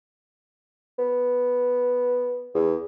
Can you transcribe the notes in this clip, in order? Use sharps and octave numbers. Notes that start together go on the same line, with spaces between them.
B3
E2